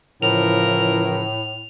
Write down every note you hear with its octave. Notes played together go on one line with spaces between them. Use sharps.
A2 C#3 E3 F3 A#4 F7